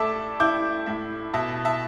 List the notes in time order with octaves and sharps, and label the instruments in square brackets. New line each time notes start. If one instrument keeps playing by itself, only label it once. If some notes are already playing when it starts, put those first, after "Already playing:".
Already playing: [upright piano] A2 A3 D5 E5 A5
E4 D6 G6
A2 E5
B2 E5 A5
E5 A5